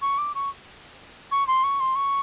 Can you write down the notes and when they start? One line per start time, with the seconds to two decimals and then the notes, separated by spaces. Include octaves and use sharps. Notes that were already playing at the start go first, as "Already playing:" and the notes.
0.02 C#6
0.18 D6
0.35 C#6
1.32 C#6
1.48 C6
1.64 C#6
1.80 C6
1.96 C#6